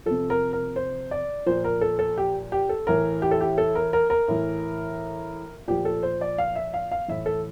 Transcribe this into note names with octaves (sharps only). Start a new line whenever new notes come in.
C3 F3 A4
A#4
A#4
C5
D5
A#2 F3 C5
A#4
A4
A4
G4
G4
A4
A2 E3 A#4
G4
A4
G4
A4
A#4
A#4
A#4
A2 E3
A#2 F3 G4
A4
C5
D5
F5
E5
F5
F5
A2 E3 E5
A4